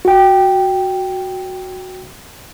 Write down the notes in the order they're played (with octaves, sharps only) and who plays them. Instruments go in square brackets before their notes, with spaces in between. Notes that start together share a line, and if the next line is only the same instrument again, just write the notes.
[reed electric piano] F#4 G5